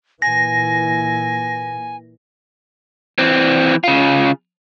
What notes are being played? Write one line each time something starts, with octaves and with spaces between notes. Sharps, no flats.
A#2 E3 G#5 A#6
E3 C4
C#3 F4